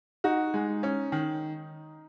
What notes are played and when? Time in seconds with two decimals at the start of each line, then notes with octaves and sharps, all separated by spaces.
0.24 D#4 F#4
0.54 G#3
0.83 C#4
1.12 D#3